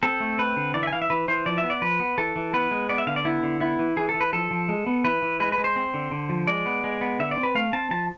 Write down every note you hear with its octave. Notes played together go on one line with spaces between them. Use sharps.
C4 A4
A3
C4 B4
D3
E3 D5
E5
G#5
E3 F5
E5
E3 B4
E3 C5
F3 D5
E5
B3
D5
F3 B4
B3
E3 A4
E3
B3 B4
G#3
B3 D5
E5
D3 F5
D5
B3 E4
D3
B3 E4
E3
E3 G#4
A4
E3
B4
F3 A4
F3
G#3
B3
E3 B4
E3
G#3 B4
B4
G#3
C5
C4
D3
D3
F3
G#3 D5
B3
G#3
B3
D3 E5
D5
C4
B4
A3 F5
C4 A5
F3 A5